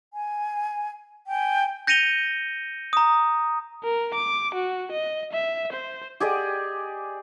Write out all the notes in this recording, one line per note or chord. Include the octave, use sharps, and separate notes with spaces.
G#5
G5 G#5
G6 A#6 C#7 D#7 F7 G7
A#5 D#6
A#4
D6
F#4
D#5
E5
C5
G4 G#4 D5 D#5